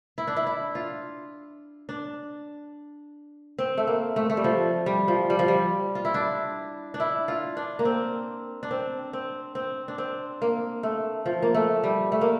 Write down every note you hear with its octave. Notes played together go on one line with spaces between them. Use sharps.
E4
D4
E4
E4
F4
D4
C4
A3
A#3
A3
A3
G3
F3
G3
F3
G3
F3
G3
F4
E4
D4
D4
E4
F4
D4
A#3
C4
D4
C4
C4
C4
D4
C4
A#3
A3
F3
A#3
A3
G3
A3
A#3